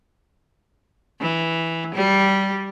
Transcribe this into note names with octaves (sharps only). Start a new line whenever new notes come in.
E3
G3